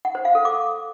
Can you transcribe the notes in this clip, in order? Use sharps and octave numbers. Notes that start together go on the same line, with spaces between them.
F#5
C5
F5
A4
D6